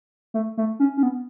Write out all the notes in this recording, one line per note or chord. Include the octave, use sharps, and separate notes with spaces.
A3
A3
C#4
C#4
B3